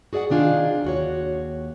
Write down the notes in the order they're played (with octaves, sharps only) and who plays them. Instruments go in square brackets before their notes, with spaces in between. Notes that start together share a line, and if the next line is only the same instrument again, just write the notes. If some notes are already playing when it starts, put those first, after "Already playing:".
[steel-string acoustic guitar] F#4 G#4 D5 E5 F#5
C3 D#3 D4 F4 G#4
D#2 F#4 C#5